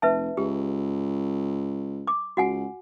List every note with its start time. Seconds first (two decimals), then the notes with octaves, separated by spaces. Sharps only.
0.02 F1 B4 E5 A5
0.37 C#2 G4
2.07 D6
2.37 C#2 F#4 F#5 G#5